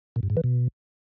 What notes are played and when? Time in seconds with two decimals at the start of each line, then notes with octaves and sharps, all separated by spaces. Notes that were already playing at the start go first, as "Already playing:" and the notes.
0.16 A#2
0.23 G2
0.30 G#2
0.37 E3
0.44 B2